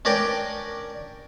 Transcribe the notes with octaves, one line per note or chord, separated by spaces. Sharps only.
C#4 D4 A#4 D5 G5